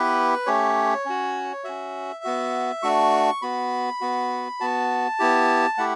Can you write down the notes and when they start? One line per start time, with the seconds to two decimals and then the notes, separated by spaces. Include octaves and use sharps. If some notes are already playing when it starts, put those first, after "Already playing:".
Already playing: B3 E4 G4 B4
0.46 A3 C#4 G4 C#5
1.05 C#4 F#4
1.64 C#4 F#4 E5
2.24 B3 F#4
2.83 A3 D4 F#4 C#6
3.42 B3 F#4 B5
4.01 B3 F#4
4.60 B3 F#4 A5
5.19 B3 E4 G4
5.78 A3 E4 G4 F#5